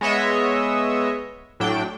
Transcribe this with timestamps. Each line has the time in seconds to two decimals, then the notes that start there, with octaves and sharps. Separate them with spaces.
0.01 G#3 B3 C#5 D#5 E5
1.60 A2 F#3 D4 G5